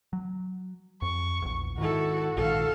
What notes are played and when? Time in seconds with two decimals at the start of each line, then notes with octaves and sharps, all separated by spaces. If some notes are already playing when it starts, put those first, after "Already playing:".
0.13 F#3
1.02 F2 C#6
1.42 A#1 E2
1.78 G#2 D#3 E4 F#4 A4
2.37 A#1 G#2 D#3 A4 F5